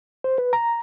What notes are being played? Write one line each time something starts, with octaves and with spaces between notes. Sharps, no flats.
C5
B4
A#5